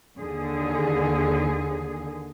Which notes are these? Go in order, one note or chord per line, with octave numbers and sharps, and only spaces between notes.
D#2 D3 G#4